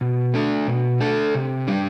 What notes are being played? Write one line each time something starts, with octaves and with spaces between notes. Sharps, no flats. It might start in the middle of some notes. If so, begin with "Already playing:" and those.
B2
A3 D4 A4
B2
A3 D4 A4
C3
G3 D4